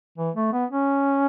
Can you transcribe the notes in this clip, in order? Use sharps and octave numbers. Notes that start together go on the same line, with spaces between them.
E3
A3
B3
C#4